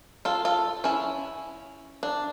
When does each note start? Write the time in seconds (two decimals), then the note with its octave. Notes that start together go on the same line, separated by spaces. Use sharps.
0.25 F4 A4
0.45 F4 A4
0.84 C#4 E4
2.03 D4